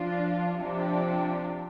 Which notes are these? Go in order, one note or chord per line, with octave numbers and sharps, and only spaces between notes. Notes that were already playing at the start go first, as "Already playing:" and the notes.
Already playing: F3 D4 F4
C3 F3 D4 G4